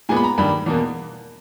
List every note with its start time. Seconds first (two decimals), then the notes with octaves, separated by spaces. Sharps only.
0.09 A#2 G#3 B3 G#5
0.17 B5
0.24 A#5
0.38 G2 D#3 G3 A#3 B5
0.66 E2 B2 A#3